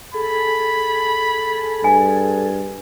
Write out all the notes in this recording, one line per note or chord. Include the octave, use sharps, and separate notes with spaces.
G#4 A4 B5
G2 G#5